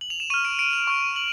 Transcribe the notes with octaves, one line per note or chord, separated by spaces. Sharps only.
F#7
F7
E7
C#6 F6 D#7
D7
D7
F7
C#6 F6
F#7